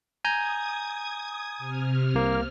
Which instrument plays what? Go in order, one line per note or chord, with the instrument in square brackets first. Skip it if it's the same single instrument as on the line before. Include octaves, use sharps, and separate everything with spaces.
[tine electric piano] G#5 A#5 G6 [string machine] D#6 G#6
[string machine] C3 F6
[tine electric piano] C2 A#3